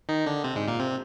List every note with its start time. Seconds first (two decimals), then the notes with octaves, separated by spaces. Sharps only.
0.09 D#3 D#4
0.26 D3 D4
0.44 C3 C4
0.56 G#2 G#3
0.68 A#2 A#3
0.80 C3 C4